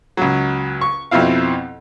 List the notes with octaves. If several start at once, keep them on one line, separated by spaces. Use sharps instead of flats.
C#2 F#3
C#6
F2 B2 F3 C4 E4 F5